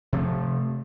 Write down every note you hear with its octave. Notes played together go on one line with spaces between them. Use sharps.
C3 F3 A3